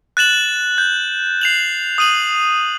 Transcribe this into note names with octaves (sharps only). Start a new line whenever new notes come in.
F#6 A6 E7 F#7
G6
C7 F7 F#7
D#6 D#7 F#7